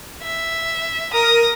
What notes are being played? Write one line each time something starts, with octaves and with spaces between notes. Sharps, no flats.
E5
A#4 D#6 A#6